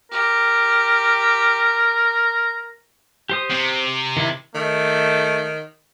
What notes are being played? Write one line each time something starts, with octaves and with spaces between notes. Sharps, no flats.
G4 A#4
G4 C5 D#6
C3
D#3 E4
D#3 A3